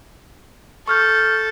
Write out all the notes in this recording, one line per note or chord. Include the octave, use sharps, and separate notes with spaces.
A4 C#6 F6 G6